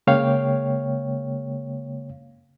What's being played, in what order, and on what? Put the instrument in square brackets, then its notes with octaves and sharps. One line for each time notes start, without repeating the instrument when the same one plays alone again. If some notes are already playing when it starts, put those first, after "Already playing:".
[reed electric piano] C#3 G#3 A#3 C#5 F5 G5